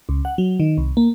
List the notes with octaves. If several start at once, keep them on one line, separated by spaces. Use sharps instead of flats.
C#2
F#5
F#3
D#3
C2
A#3